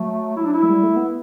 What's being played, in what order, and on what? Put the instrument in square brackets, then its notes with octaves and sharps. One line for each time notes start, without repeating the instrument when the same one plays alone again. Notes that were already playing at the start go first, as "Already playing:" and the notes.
Already playing: [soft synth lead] F#3 [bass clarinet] A3
[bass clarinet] E4
D4
E4
[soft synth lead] A3
G3
A3
B3